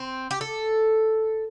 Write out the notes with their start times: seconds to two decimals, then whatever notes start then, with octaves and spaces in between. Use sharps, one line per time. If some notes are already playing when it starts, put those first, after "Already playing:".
Already playing: C4
0.31 G4
0.41 A4